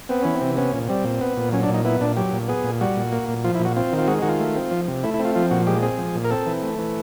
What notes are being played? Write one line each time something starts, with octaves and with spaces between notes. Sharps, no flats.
B3 C4
E3 C#4
C4
C3
B3 C#4
A#2
G3 C4
A#2
B3
A#2
F#3 C#4
D4
A#2
D#4
B3 E4
A#2 D4
F#3 G4
A#2
B3 G#4
A#2
G3 F#4
A#2
A#3
A#2
F3 F4
E4
A#2
F#4
C4 F4
D#3
F4
G#3 F#4
D#3 F#4
F4
A3
C4
F3
C3
A3 E4
E4
C4
F4
F3 F4
A#2 F#4
G#3 G4
C4 G#4
F3
A#2
A#4
C4 A4
E3
A3
E3